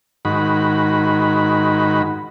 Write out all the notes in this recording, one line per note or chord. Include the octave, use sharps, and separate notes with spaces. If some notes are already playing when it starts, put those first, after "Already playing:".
G#2 D#3 F#4 B5